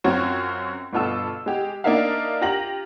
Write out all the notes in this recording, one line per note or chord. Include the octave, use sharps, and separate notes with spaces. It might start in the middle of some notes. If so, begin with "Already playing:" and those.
F#2 C4 F4 F#4 C#5
G1 B2 F4 A4 E6
G#3 G4
A#3 D4 D#4 A#4 E5 F5
F4 G4 A#5 A#6 F#7